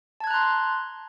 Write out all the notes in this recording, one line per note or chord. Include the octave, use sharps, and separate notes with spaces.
A5 A#5 C6 F#6 G#6